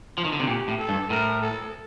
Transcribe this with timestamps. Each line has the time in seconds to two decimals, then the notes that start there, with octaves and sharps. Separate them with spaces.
0.18 F3
0.25 D#3
0.32 D3
0.40 C3
0.47 A#2 G4
0.68 A2
0.79 A4
0.89 G2
1.10 A2 A#4
1.42 A4